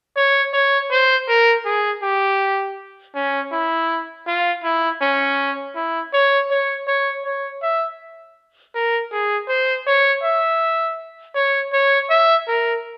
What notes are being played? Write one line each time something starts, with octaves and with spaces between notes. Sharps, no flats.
C#5
C#5
C5
A#4
G#4
G4
C#4
E4
F4
E4
C#4
E4
C#5
C#5
C#5
C#5
E5
A#4
G#4
C5
C#5
E5
C#5
C#5
E5
A#4